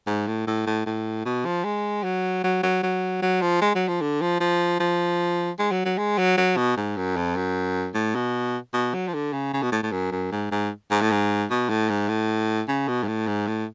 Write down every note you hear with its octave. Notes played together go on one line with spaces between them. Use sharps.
G#2
A2
A2
A2
A2
B2
F3
G#3
F#3
F#3
F#3
F#3
F#3
F3
G#3
F#3
F3
D3
F3
F3
F3
G#3
F#3
F#3
G#3
F#3
F#3
B2
G#2
F#2
F2
F#2
A2
B2
B2
F#3
F3
D3
C#3
C#3
B2
A2
A2
F#2
F#2
G#2
G#2
G#2
A2
G#2
B2
A2
G#2
A2
C#3
B2
G#2
A2
G#2
A2